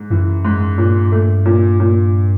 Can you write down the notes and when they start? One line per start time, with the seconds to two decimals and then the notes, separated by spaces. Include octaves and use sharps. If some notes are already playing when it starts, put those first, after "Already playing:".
Already playing: G#2
0.10 F#2 E3
0.45 G#2
0.78 G2 A#2
1.12 A3
1.45 A#2
1.80 A#2